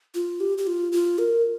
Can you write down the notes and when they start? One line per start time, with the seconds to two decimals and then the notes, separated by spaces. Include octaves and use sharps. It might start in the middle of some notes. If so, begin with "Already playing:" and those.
0.15 F4
0.40 G4
0.58 G4
0.67 F4
0.92 F4
1.18 A#4